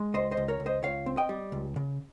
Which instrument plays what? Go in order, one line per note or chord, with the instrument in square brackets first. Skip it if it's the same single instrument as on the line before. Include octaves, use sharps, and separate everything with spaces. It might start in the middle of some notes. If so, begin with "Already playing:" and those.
Already playing: [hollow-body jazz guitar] G#3
C#2 C5 D#5
C5 D#5
C#2
A#4 C#5
C#2
C5 D#5
C#2 C#5 F5
C4
D#5 G5
G3
C#2
C#3